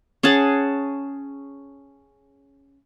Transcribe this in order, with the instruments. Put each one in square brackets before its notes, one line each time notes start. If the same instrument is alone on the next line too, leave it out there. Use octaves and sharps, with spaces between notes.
[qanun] C#4 G#4 F#5 A5